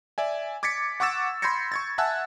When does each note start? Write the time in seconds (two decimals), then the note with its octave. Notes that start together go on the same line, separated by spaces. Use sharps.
0.18 D5 E5 G#5
0.63 D6 G#6 A6 B6 C#7
1.00 F#5 C#6 D6 E6 A6 E7
1.42 B5 C6 G6 G#6 A#6 C#7
1.72 C#6 G#6 A6
1.98 E5 F#5 G#5 A5 E6 F#6